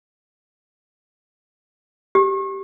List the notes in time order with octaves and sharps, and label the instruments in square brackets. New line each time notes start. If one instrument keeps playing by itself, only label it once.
[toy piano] G4